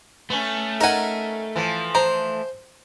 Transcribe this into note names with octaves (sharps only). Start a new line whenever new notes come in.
A3 B3 C#4
D#4 A#4 F#5 G#5
E3 F3
C5 A#5